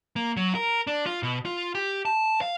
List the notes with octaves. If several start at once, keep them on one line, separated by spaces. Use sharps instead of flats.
A#3
F#3
A#4
D4
F4
B2
F4
G4
A5
F5